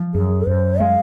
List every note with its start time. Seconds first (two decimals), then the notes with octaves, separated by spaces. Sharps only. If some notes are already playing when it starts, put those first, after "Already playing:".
Already playing: F3
0.14 F#2 G#4
0.47 F#2 C5
0.80 G#3 F5